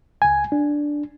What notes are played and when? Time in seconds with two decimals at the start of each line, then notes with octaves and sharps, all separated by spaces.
0.22 C#2 G#5
0.52 D4